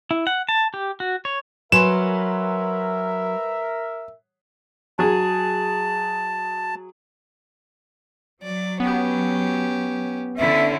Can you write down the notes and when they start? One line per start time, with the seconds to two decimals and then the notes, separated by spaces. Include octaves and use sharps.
0.11 E4
0.27 F#5
0.49 A5
0.74 G4
1.00 F#4
1.25 C#5
1.72 F#3 A#4 B4 E5 G#5 C6 E7
4.99 F#3 G#4 A5
8.43 F#3 D5
8.80 B3 C#4 G4
10.38 D3 C#4 E4 E5